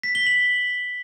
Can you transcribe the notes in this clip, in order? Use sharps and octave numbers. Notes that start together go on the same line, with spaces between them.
B6
G7
F#7